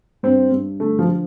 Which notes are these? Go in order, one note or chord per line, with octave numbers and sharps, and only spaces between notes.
G2 C4
G2
D3 A3
F3
F3